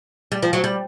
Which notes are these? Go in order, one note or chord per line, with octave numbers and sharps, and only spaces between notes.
G3
F3
F#3
G3